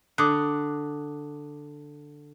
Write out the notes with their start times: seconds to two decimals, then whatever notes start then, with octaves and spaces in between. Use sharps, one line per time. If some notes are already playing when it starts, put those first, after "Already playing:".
0.18 D3 D6 D#6 F#6